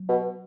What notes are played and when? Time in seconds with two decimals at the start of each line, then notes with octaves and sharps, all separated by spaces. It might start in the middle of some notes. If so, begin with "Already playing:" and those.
Already playing: F#3
0.09 B2